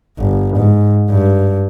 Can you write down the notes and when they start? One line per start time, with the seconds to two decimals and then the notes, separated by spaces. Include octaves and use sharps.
0.19 G1
0.57 G#2
1.10 G2